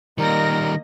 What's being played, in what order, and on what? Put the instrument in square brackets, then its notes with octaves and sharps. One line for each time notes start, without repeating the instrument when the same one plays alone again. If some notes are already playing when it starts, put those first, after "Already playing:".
[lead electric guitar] D#3 G3 [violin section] A#3 D#5 A#6 [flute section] A#4 D5 A#5